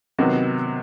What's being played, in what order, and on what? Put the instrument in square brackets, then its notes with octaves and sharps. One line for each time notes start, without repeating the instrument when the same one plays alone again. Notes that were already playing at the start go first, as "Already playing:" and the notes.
[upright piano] C3 D#3 F#3 B3 F#4